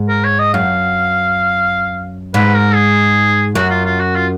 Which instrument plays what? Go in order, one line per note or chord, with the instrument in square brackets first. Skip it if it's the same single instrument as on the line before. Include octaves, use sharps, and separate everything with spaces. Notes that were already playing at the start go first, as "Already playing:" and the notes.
Already playing: [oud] G#2
[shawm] A#4
C#5
D#5
[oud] F#2 [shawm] F5
[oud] G#2 [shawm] B4
[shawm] A#4
G#4
[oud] F#2 [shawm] F#4
[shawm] F4
F4
F#4
F4